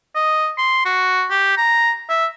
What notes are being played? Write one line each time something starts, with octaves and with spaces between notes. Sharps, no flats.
D#5
C6
F#4
G4
A#5
E5